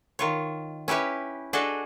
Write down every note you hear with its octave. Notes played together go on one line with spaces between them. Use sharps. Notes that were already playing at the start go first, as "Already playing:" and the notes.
D#3 F4 C#5
C#4 E4 G4 B4 C#5
D4 F#4 G#4 A4 D#5